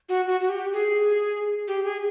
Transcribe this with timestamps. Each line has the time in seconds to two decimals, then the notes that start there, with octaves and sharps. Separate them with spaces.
0.09 F#4
0.27 F#4
0.40 F#4
0.49 G4
0.73 G#4
1.68 G4
1.85 G#4